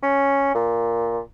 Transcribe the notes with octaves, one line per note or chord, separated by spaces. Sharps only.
C#4
A#2